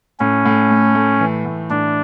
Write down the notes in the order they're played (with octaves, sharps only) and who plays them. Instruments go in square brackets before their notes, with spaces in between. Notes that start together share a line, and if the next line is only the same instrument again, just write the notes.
[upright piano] A2 [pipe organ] C#4
[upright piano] A2
A3
A3
E3
A2
[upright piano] A2 [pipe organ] D4